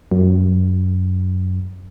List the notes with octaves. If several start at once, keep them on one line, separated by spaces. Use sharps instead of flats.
F#2